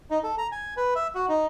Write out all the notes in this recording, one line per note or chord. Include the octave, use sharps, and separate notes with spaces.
D#4
A4
A#5
G#5
B4
E5
F#4
D#4